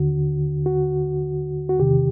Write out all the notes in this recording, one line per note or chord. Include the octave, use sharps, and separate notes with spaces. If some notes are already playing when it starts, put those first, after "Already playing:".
Already playing: D#2 D3 F#4
F#4
F#4
E2 C3 D#3 G4